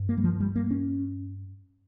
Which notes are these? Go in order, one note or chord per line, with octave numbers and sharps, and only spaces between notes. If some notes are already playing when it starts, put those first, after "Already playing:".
Already playing: G2
A#3
G3
F3
G3
A#3
C#4